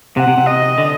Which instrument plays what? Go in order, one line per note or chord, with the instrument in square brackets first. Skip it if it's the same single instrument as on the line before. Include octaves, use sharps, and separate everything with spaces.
[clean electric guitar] C3 [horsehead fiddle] F#5
[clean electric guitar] C3
C3
[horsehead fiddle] D#5
[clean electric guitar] D3